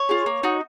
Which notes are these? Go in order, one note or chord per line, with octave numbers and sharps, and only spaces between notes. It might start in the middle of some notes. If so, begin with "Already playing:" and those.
Already playing: C#5
F4 G#4
A#3
D#4 F#4